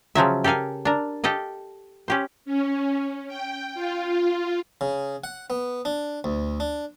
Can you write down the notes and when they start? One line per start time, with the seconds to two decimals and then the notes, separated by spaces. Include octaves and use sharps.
0.15 C#3 F3 F#3 E5
0.44 G4 A4 A#4 F5 G#5
0.85 D4 A#4
1.24 G4 A4 D#5 F5
2.08 C#4 G4 C5
2.45 C#4
3.28 G5
3.75 F4
4.81 C#3
5.24 F#5
5.50 B3
5.85 D4
6.24 D2
6.60 D4